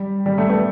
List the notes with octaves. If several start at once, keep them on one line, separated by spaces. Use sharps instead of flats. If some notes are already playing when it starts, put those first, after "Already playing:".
Already playing: G3
G3
G3 A3
A3 B3